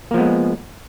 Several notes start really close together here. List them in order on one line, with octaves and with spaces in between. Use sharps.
A#3 F3 B3 G#3